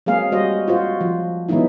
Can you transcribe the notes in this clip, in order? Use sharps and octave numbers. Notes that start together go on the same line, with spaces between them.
F#3 G#3 A#3 C4 G#4 F5
G3 F#4 C5 D#5
F4 F#4 C5
F3
E3 F#3 G#3 B3 D#4 E4